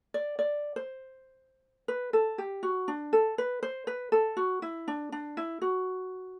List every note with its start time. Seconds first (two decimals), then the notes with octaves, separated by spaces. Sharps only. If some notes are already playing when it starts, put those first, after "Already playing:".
0.14 D5
0.39 D5
0.76 C5
1.88 B4
2.13 A4
2.38 G4
2.63 F#4
2.88 D4
3.13 A4
3.38 B4
3.63 C5
3.87 B4
4.12 A4
4.37 F#4
4.62 E4
4.88 D4
5.12 D4
5.37 E4
5.62 F#4